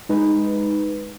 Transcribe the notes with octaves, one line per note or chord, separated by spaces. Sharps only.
G#3 D#4 B4